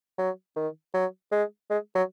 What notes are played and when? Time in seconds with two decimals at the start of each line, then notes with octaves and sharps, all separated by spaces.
0.18 F#3
0.56 D#3
0.94 F#3
1.32 G#3
1.70 G#3
1.95 F#3